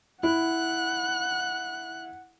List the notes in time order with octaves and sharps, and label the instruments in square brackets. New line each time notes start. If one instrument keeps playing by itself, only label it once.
[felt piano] E4 [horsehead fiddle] F#5 [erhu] F#6